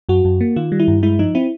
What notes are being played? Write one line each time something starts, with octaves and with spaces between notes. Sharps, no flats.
F#2 F#4
F#2
A#3
D#3 F4
G3
E4
G2
G#3 E4
F3 D#4
C4 E4